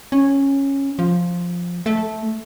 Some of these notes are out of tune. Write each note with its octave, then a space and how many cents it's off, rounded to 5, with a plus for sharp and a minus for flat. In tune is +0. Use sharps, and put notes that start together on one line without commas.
C#4 -10
F3 +5
A3 -10